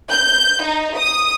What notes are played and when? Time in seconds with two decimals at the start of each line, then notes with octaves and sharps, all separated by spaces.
0.10 G6
0.63 D#4
0.97 D#6